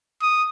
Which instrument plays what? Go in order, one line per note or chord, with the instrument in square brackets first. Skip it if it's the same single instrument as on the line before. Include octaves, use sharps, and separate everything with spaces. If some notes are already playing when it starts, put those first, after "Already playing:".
[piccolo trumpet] D#6